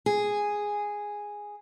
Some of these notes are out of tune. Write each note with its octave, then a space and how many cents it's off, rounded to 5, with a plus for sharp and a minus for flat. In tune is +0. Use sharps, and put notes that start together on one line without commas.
G#4 -5